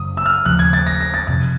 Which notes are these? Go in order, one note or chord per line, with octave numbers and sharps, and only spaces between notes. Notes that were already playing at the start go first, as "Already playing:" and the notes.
Already playing: F#2 C#3 F#3 D#6
E6
F6
D#2 C#3 F3 A3 F#6
G#6
A6
A#6
A#6
A6
F2 C3 F3 A6